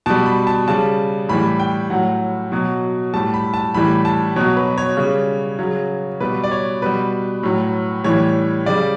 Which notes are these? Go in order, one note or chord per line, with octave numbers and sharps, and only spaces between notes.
B2 G3 A5
B5
A5
C#3 G3 A5
A2 E3 G3 B5
G5
A2 F#3 F#5
B2 F#3
A2 G3 A5
B5
A5
A2 E3 G3 B5
A5
B2 F#3 C#5
B4
C#5
C#3 G3
C#3 F#3
B2 G3 B4
D5
C#5
B2 G3 B4
A2 F#3
A2 E3 G3 C#5
C#3 G3 D5